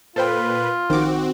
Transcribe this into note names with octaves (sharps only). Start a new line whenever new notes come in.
A#2 F4 A4 B4 C5 G5
A#1 D#3 C4 F#4 D6